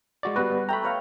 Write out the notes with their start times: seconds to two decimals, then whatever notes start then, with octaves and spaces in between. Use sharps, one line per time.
0.23 G#3 F#4 D5
0.36 G3 B3 F#4 B4
0.69 A3 G5 A#5 B5
0.83 B4 C#5 F5